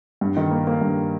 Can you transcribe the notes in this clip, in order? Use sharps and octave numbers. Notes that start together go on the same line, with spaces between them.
G2
D#3
A#3
A#3
G2